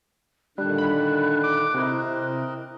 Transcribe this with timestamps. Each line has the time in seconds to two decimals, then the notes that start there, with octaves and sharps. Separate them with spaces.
0.58 A#2 D3 D#3 G3 D4 F#6
0.78 B5
1.44 D6
1.74 C3 C4 E4 A#4 C5 D#5